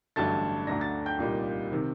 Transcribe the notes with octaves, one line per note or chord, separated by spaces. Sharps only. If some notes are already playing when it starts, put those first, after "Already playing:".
A1 G2 D3 F#3 A3 A5 A6
D2 D3 A3 D4 A#5 A#6
A5 A6
G5 G6
C2 A#2 G3 A#3 D#4
C3 D#3